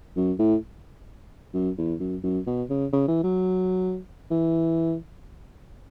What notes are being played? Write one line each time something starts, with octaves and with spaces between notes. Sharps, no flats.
F#2
A2
F#2
E2
F#2
F#2
B2
C#3
C#3
E3
F#3
E3